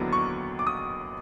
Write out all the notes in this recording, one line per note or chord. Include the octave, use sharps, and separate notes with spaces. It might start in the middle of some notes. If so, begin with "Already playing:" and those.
Already playing: D#2 D3 F#3 B3 E4
C#6
D6
D#6